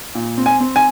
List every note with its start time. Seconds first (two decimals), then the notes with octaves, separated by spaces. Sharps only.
0.15 A#2
0.38 C4
0.46 G#5
0.60 C4
0.76 G#5